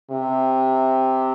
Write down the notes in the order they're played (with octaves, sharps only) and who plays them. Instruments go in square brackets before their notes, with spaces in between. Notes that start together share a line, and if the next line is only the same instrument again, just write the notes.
[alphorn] C3